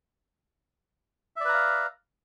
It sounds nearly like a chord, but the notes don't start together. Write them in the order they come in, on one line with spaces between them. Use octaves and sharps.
E5 D5 B4 A#5 F5